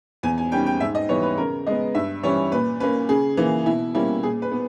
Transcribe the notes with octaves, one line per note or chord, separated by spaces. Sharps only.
E2 G#5
G#5
D#3 G3 C#4 G5
G5
G#2 E5
D#5
E3 G3 B3 C#5
B4
C#3 A#4
G#3 B3 D#5
G2 E5
E3 G3 C#4 C#5
A#2 B4
A#3 C#4 B4
C#3 G#4
E3 A#3
B2 E4
G3 A#3 C#4 E4
A#2 G#4
B4
B3